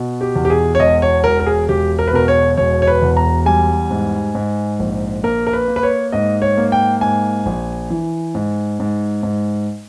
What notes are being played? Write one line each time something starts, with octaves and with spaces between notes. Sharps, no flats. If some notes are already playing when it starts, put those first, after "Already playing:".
Already playing: B2
G4
E2
G4
G#4
C#5
E1 D#5
C#5
E1 A#4
A#4
G#4
E1 G4
A#4
B4
B2 A#4
C#5
E1 C#5
C#5
B4
E2
A#5
G3 G#5
G#2
G#2
A#1
A#3 A#4
A#4
B4
A#3
B4
C#5
G#2 D#5
C#5
A#3
G5
G#2 G#5
A#1
E3
G#2
G#2
G#2